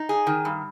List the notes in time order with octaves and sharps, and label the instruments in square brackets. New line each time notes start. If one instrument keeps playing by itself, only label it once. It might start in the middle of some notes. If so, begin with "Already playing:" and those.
Already playing: [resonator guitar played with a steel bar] D#4
G#4
D#3
G2